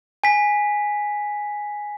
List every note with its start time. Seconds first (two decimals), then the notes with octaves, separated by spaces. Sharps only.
0.24 G#5 B6